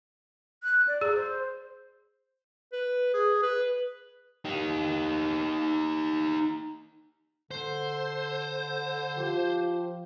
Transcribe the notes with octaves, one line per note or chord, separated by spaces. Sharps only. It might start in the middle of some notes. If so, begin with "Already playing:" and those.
F#6
D5
G#4
C5
B4
G#4
B4
D#4 G4
D3 C5
F3 G4